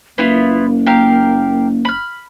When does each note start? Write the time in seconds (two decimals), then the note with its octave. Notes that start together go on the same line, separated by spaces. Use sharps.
0.18 F#1 A#3 B3 E4 F4
0.87 G4 A#4 F5
1.85 B5 F6